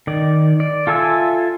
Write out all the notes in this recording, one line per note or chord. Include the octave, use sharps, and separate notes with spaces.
D#3 D5
D5
F4 A4 E5 G#5 E6